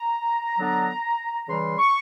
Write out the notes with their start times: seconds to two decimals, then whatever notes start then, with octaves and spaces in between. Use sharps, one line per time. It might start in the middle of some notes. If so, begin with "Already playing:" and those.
Already playing: A#5
0.59 D3 F#3 B3 D4
1.49 C#3 E3 G3 C6
1.79 C#6